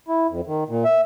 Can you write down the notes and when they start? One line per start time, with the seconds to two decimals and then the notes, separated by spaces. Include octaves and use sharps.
0.08 E4
0.30 F2
0.47 D#3
0.69 A#2
0.85 E5